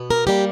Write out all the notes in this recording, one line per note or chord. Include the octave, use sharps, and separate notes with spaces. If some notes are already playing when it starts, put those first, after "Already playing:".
Already playing: B2 B3
A#4
G3 A#3 G4